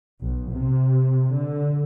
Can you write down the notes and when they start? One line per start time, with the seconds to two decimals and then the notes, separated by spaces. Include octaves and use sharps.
0.21 B1
0.52 C3
1.33 D3